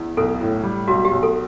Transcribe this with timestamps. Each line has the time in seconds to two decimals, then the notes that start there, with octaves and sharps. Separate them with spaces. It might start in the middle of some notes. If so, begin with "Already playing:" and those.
Already playing: E2
0.17 B1 A4
0.41 A2
0.63 G3
0.87 B1 F#4
1.05 G4
1.11 B1
1.23 A4